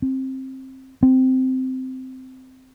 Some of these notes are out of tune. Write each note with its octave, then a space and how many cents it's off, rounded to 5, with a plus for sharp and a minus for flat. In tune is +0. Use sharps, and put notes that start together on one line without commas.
C4 +15
C4 -10